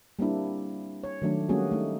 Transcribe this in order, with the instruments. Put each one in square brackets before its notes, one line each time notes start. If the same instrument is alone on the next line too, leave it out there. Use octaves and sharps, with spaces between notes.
[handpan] G3 A#3 C4 D4 E4
C#5
D#3 F#3 A3 D4
G3 A3 A#3 C#4 F#4 G#4
A3 D#4